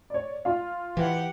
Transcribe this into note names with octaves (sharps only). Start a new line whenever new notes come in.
C#5 D5
F4 F5
E3 G4 F#5